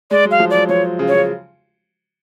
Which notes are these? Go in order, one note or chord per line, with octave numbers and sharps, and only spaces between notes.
G#3 D5
F#3
F5
F3
F#3 D5
F3 C#5
C#3
C#5
C#3